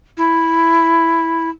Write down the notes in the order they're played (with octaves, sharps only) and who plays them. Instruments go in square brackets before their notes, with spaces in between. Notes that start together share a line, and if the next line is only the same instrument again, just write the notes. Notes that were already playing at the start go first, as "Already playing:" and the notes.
[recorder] E4